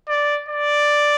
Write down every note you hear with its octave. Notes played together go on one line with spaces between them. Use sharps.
D5
D5